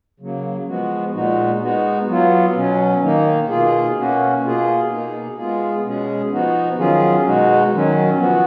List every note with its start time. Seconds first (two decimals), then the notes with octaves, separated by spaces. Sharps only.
0.20 C#3 F#3 A#3
0.68 F3 G#3 B3 F#4
1.14 A#2 G#3 D#4 F#4
1.61 G#3 B3 D#4 F#4
2.08 F#3 B3 F4
2.55 B2 F#3 C#4
3.02 D#3 A#3 D#4
3.49 B2 A#3 F4 G#4
3.97 B2 A#3 C#4 F#4
4.44 B2 A#3 F4 G#4
4.90 B2 A#3 D#4 G#4
5.37 G#3 B3 F4 G#4
5.84 B2 G#3 C#4 G#4
6.32 F3 B3 D#4 F#4
6.78 D#3 F#3 C#4 F4 G#4
7.25 B2 G#3 D#4 F#4
7.72 D#3 F#3 C#4
8.19 F3 B3 F#4